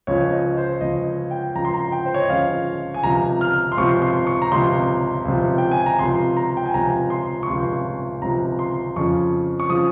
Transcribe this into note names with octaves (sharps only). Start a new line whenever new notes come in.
C#2 C#3 F3 C#5
D#5
C5
C#2 C#3 F3 D#5
G5
C#2 C#3 F3 A#5
C6
A#5
G5
C5
C#5
D#5
C#2 C#3 F3 F5
G#5
C#2 C3 F3 A#5
F6
C6
C#2 C3 F3 C#6
C6
C#6
A#5
C#2 C3 F3 C6
C#2 C3 F3
G5
G#5
A#5
C#2 C3 F3 C6
A#5
G5
G#5
C#2 C3 F3 A#5
C6
C#6
C#2 C3 F3 C6
C#2 C3 F3 A#5
C6
F2 C#3 F3 C#6
C#6
C#3 F3 D#6